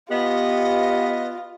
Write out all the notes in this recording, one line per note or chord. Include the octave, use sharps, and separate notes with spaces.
B3 F4 G4 D#5